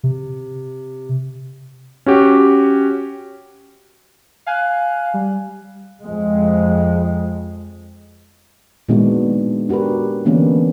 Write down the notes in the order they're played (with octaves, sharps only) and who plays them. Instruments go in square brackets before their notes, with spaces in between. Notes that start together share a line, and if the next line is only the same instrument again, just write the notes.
[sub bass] C3
[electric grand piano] C#4 F#4 G4
[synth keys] F5 G#5 F#6
G3
[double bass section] F2 G#3
[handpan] A#2 D#3 G#3 B3 D4 F#4
D4 F#4 G4 A#4 B4
D3 E3 A#3 B3 C#4 D4